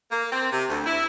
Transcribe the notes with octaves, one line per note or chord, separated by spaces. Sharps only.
A#3
C4
C3
D2
E4